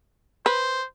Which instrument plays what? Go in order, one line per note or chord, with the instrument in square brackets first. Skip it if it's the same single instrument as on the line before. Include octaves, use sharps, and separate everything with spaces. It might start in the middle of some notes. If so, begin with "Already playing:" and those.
[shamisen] B4 [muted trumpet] C5